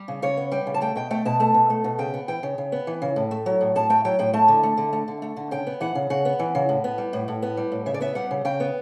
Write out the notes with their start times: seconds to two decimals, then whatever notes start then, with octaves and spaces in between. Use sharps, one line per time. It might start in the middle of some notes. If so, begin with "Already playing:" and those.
Already playing: G3
0.08 C#3
0.22 C#3 C#5
0.37 B3
0.52 G3 G5
0.67 C#3
0.74 A5
0.81 A3 G5
0.96 B2 G5
1.11 A3 G5
1.25 B2 A5
1.40 A3 A5
1.54 B2
1.70 A3
1.84 B2
1.99 C#3 G5
2.14 B3
2.28 E3 G5
2.43 C#3
2.58 C#3
2.72 B3
2.87 E3
3.02 C#3
3.16 A2
3.31 A3
3.46 F#3
3.61 A2
3.76 A2 A5
3.90 A3 G5
4.05 F#3 G5
4.19 A2 G5
4.33 A3 A5
4.48 D3
4.63 A3
4.77 D3
4.93 A3
5.08 D3
5.22 A3
5.36 D3
5.51 C#3 G5
5.67 B3
5.81 E3 F#5
5.95 C#3
6.10 C#3 F#5
6.25 B3
6.39 E3
6.55 C#3
6.69 A2
6.84 B3
6.98 G3
7.13 A2
7.28 A2
7.42 B3
7.57 G3
7.72 A2
7.86 C#3 E5
7.94 D5
8.01 B3 E5
8.15 G3 F#5
8.31 C#3
8.45 C#3 G5
8.60 B3